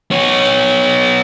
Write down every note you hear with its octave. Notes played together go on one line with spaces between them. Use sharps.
B3 C#5